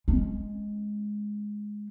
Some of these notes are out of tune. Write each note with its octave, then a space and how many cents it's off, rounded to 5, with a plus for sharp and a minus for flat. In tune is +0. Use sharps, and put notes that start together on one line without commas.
G#3 +0 C#4 -30